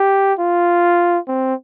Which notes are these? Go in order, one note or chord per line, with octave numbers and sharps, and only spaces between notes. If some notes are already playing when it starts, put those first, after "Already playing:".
Already playing: G4
F4
C4